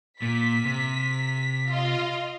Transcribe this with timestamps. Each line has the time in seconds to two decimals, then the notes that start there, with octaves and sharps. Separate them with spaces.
0.22 A#2 B6
0.65 C3
1.70 F4 D#5